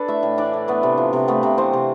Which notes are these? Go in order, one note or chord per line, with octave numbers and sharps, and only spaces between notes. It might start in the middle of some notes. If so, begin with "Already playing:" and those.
Already playing: D4 A4 B4 A5 B5
A3 E4 E5
A2
E3 D4 D5
A2
A3 B3 B4
C3
F3
C3
A3 B3 B4
C3
E3 C4 C5
C3